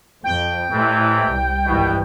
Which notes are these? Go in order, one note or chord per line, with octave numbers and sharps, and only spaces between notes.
F2 G5
F2 A2 C3 E3
C2 G3
G#1 G2 B2 E3